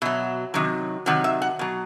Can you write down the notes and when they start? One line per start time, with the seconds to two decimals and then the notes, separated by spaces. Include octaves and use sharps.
0.02 B2 F#3 E5
0.54 C3 D#3 F#3
1.06 C3 D#3 F#3 F#5
1.24 E5
1.42 F#5
1.59 B2 F#3